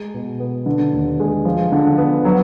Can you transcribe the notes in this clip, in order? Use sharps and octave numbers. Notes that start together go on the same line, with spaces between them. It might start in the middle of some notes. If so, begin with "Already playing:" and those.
Already playing: G#3
B2
B3
D3
D#2
G#3
F3
D3
B3
F#3